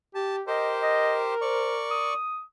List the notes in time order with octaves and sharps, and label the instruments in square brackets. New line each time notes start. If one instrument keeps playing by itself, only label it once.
[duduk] G4 [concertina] A5
[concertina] G4 C5 [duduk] A#4 [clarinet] D#5
[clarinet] D#5
[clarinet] C5 [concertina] D5 C#6
[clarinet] D#6